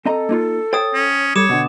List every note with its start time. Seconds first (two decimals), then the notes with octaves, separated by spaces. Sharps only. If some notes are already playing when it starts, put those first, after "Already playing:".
0.05 C4 A4 D#5 A#5
0.29 A#3 D#4 F4
0.73 C5 C#5 G5 D#6 A6
0.94 C#4
1.36 G3 A4 C#5 D6 E7
1.49 B2 D3 F#5